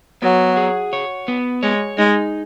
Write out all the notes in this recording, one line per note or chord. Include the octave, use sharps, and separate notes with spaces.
F#3 B3
G#4
C#5
B3
G#3 C#5
G#3 D#4